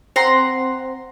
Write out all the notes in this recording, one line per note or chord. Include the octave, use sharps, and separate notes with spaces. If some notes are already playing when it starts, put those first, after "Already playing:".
C4 F#5 A#5 C6